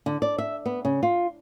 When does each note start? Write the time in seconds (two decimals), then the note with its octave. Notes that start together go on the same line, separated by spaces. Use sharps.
0.06 D3
0.22 D5
0.38 E5
0.66 B3
0.85 C#3
1.03 F4